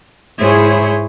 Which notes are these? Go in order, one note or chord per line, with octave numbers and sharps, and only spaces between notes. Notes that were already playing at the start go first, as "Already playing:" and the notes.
G#2 E4 G#4 C5 C#5